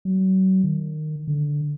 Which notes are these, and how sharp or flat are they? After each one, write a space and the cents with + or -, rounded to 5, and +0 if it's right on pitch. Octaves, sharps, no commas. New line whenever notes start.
F#3 +35
D#3 -20
D3 -5